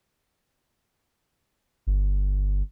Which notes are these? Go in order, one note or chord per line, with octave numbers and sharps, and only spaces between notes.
G1